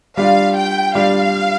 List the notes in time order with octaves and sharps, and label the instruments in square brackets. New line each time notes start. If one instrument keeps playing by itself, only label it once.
[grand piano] G3 D4 F4 [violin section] F5
[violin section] G5
[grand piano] G3 D4 F4 [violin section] F5